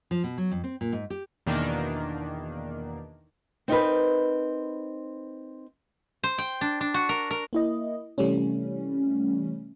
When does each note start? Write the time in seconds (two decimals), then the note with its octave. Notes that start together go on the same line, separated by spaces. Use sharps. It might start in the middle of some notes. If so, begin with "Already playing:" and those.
0.11 F3
0.24 B2
0.38 F#3
0.51 F2
0.64 C4
0.81 A#2
0.92 G#2
1.10 G4
1.46 E2 B2 D#3 A#3 D4
3.68 C4 D#4 A#4 B4
6.24 C5
6.38 G5
6.61 D4
6.81 D4
6.94 F#4
7.09 A#4
7.31 A#4
7.53 A#3 E4 D#5
8.18 C3 E3 G3 A3 C#4